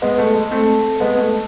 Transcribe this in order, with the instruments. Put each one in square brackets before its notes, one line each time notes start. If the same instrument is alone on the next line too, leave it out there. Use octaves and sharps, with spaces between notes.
[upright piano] G#3 B3
A3
G#3
A3 C4
G#3 B3
A3